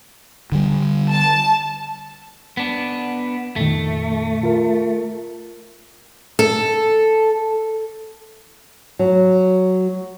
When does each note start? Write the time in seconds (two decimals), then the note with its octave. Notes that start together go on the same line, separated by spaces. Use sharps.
0.52 D3 G3
1.11 A5
2.57 B3 D4
3.56 F2 A#2 D#3 A3
4.43 F4 A#4
6.39 A4
8.99 F#3